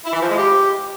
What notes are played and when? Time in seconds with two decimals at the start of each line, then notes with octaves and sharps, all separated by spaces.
0.04 E4
0.12 E3
0.20 F3
0.28 G#3
0.36 G4